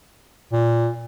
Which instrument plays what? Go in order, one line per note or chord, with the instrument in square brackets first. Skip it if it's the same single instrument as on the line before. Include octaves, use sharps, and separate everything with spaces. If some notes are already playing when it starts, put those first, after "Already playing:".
[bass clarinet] A#2